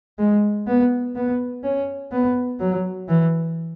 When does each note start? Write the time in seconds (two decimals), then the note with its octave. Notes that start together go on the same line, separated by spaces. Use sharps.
0.19 G#3
0.67 B3
1.16 B3
1.63 C#4
2.12 B3
2.59 F#3
3.08 E3